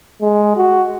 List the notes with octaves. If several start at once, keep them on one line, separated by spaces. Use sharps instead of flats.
G#3
F#4